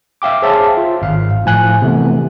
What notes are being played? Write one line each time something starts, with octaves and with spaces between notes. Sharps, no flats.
E5 F5 G5 D6
G#4 C5 C#5 E5 F5 A5
F4
G#1 F5
A2 F3 G#5 F#6
C3 E3 A3 B3